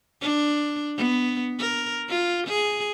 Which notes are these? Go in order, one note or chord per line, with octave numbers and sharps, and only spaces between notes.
D4
B3
A#4
F4
G#4